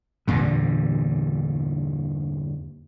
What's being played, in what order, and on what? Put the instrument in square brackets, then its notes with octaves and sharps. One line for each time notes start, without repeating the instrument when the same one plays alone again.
[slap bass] E2 G2 A#2 D3